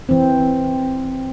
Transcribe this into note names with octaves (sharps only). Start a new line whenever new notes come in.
E3 C4